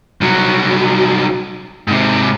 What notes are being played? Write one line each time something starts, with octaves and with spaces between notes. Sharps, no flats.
C2 F#3
G#2 C3